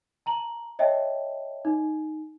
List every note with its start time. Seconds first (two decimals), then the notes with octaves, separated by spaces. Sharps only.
0.26 A5 A#5 F#7
0.79 C#5 D#5 E5 G5 A5
1.65 D#4